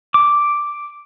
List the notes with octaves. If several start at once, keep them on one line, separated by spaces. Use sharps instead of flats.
D6